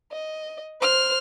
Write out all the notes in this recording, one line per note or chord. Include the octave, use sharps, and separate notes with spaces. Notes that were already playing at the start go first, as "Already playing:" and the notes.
D#5
C5 F6